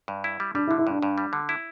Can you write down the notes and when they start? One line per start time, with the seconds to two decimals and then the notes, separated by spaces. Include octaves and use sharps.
0.08 G2
0.24 E4
0.40 G3
0.54 G3 D4
0.67 E4
0.71 D3
0.78 E4
0.87 G2 D4
1.03 G2
1.18 G3
1.33 D3
1.49 E4